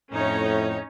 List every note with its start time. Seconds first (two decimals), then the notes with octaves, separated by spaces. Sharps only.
0.12 F2 A2 C#4 D#4 C#5